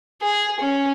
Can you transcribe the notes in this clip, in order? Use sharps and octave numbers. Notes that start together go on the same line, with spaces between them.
G#4
C#4